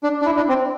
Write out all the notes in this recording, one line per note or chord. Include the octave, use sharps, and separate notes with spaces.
D4
D4
E4
D4
C4